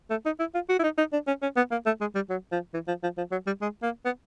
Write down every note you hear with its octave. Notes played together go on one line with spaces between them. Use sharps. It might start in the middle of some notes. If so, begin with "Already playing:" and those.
A3
D#4
E4
F4
F#4
E4
D#4
D#4
D4
C#4
C#4
B3
A#3
A3
G#3
G3
F#3
F3
E3
F3
F3
F3
F#3
G3
G#3
A#3
B3